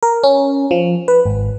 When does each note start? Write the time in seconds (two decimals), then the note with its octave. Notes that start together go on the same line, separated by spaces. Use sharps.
0.03 A#4
0.24 C#4
0.71 F3
1.08 B4
1.25 G#1